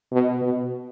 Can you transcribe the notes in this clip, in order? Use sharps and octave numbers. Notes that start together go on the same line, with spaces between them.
B2
B2